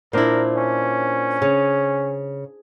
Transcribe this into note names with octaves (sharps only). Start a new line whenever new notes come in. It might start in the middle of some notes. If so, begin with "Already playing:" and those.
A#2 D4 E4 A#4 C5
C#4
C#3 G#4